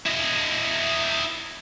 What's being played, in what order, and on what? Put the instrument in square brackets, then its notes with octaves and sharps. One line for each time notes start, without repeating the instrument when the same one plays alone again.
[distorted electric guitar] E4 D#5